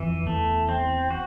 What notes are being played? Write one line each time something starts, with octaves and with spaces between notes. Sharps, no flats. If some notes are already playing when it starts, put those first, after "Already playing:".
Already playing: F2 E3
E2 A3
C4
F#4